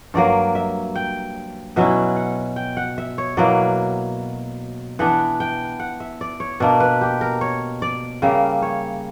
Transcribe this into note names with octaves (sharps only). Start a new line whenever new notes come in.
G2 F#3 A#3 D5
E5
G5
B2 F#3 C#4 E4 E5
F#5
G5
F#5
E5
C#5
B2 F#3 A#3 E4 D5
E3 B3 D4 F#5
G5
F#5
E5
D5
C#5
B2 A#3 D4 D5
B4
G4
A#4
C#5
D5
C#3 G3 A#3 E5
C#5